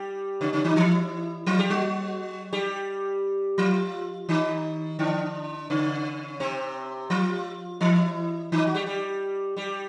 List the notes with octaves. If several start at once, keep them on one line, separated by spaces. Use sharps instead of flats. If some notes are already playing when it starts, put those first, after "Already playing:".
Already playing: G3 G4
C#3 C#4
C#3 C#4
D#3 D#4
E3 E4
F3 F4
G3 G4
F#3 F#4
G3 G4
F3 F4
D#3 D#4
D3 D4
C#3 C#4
C3 C4
F3 F4
E3 E4
D#3 D#4
F#4
G3 G4
G3 G4
G3 G4